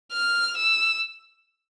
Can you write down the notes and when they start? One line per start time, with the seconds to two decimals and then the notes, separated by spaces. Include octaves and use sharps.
0.13 F6
0.57 E6